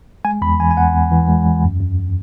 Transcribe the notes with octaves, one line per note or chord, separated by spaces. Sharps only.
G#3 G#5
E2 B5
E3 G#5
G#5
E2 F#5
E2
E3
G#3
E2
F#2
F#2